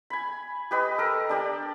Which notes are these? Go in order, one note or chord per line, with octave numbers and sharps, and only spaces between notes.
G#5 B5
G4 B4 D#5
A4 A#4
D4 G4 D5